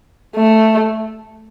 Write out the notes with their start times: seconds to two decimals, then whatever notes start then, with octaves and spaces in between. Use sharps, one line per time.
0.36 A3